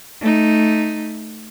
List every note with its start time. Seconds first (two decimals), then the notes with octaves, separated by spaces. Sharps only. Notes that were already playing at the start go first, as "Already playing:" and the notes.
0.21 A3 D#4